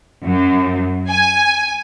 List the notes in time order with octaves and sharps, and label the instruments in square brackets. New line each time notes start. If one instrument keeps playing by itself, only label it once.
[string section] F#2
G#5